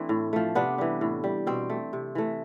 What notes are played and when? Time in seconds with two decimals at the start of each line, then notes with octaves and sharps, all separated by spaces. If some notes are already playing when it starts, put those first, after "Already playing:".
Already playing: E3 A3 C4 D4 E4
0.09 A2
0.33 F3 A3
0.55 C3 B3 D4
0.78 E3 G3
1.01 A2
1.24 G3
1.47 B2 C4
1.70 A3
1.93 C3
2.15 E3 A3